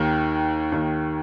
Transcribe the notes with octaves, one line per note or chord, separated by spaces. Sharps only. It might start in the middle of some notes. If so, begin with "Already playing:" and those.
Already playing: D#2 D#3
D#2 D#3